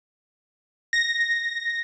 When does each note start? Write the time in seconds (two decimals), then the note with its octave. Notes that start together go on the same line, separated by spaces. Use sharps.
0.93 A#6